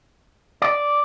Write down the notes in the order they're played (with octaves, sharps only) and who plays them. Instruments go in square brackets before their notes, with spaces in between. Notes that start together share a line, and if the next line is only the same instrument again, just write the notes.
[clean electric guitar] D5